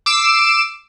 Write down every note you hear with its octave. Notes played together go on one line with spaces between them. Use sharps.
D6 E6 C7 E7